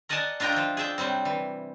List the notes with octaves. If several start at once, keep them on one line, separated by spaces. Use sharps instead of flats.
A#4 D5 D#5 F#5 G#5 A5
D4 F4 A#4 D#5 G5
F3 A3
G#4 D5 E5 G5
C3 F#3 G3 C4
E3